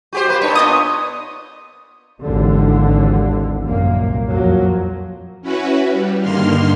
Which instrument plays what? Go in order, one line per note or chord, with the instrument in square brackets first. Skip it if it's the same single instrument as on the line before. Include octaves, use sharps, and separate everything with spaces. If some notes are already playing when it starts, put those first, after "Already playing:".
[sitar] F#4 G4 C5
A#3 B4 C5
[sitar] A#2 D4 C#5 [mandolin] B4
[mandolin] B3 D#5 D#6
[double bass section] G#1 D#2 D3 E3
C2 F#2 A#2 A#3
F2 F3 F#3 A#3
[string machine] C#4 E4 F#4 B4
G3
G2 D3 D#3 A#3 C6 F6